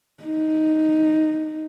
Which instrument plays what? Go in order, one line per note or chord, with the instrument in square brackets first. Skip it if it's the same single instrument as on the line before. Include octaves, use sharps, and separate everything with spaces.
[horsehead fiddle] D#4